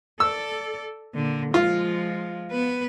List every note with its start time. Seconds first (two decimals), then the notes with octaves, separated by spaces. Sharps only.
0.20 A4 D5 E6
1.15 A#2 D3
1.54 F3 G#3 F4
2.51 B3 B4